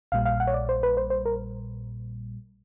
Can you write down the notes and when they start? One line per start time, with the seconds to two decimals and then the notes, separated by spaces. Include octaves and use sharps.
0.12 A#1 A#2 G3 F5
0.25 F5
0.40 F#5
0.47 C#5
0.54 D5
0.69 C5
0.83 B4
0.97 C5
1.10 C5
1.25 A#4